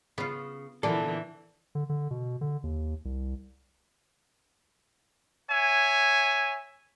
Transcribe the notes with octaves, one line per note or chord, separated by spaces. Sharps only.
C#3 B3 F4
A#2 D3 E3 B3 D4 A4
D3
D3
B2
D3
D#2
C2
C#5 E5 G#5